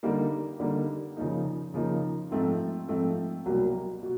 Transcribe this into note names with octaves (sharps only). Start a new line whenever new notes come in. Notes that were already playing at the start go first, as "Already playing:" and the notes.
D3 G3 A#3 D#4
D3 G3 A#3 D#4
C#3 F3 A#3 D#4
C#3 F3 A#3 D#4
G#2 F3 A3 C4 F4
G#2 F3 A3 C4 F4
C2 B2 F#3 A#3
B2